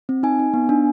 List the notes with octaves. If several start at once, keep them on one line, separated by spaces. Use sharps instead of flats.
C4
D#4 G#5
D#4
B3
D4